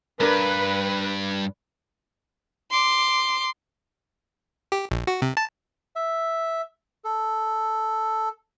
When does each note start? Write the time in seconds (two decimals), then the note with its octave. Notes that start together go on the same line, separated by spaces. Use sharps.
0.20 G2 D4 A#4 B4
2.71 C6 D6
4.72 G4
4.91 A#1
5.07 F#4
5.22 C3
5.37 A5
5.96 E5
7.04 A4